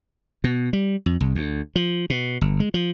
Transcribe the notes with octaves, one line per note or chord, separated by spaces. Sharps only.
B2
G3
F2
C2
D2
F3
B2
G1
G#3
F3